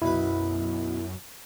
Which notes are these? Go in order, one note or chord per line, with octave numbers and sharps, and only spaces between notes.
B1 F#2 E4 B4